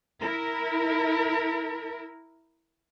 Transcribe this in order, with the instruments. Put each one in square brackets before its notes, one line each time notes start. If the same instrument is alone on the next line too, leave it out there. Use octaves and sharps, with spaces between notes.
[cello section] E4 A#4